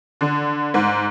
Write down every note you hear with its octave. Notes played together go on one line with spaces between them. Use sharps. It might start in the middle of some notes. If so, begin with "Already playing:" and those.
D3
G#2